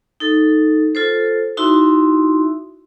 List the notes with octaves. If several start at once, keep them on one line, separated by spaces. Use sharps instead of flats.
D#4 A4
F4 A4 C5
D#4 E4 F#4 E5 C6